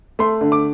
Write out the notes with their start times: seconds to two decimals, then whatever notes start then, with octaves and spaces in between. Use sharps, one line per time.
0.19 A3 C6
0.41 D3
0.52 D6